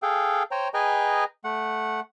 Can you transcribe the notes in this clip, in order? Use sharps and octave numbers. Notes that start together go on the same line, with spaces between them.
G#4 A4 F5 G5
C5 C#5 G5 A#5
G#4 B4 D#5 G5 G#5 A#5
A3 F#5